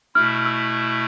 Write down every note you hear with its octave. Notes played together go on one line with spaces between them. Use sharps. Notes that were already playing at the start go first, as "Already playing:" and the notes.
B2 A3 E4 F6
E6